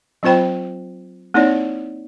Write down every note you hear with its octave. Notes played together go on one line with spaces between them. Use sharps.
F#3 C4 F4 C5 G5 B5
A#3 C4 D#4 E4 C#5 D5